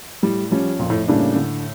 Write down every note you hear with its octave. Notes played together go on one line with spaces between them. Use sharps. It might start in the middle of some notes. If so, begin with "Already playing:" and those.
A2 G3
F3 G3 C#4
F2 A#2
A2
A2 C#3 G3 A#3 D4
D3